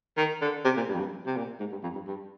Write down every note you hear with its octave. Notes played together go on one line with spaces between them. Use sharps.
D#3
D3
C3
A#2
G2
F2
G2
C3
A#2
G#2
G2
F2
G2
G2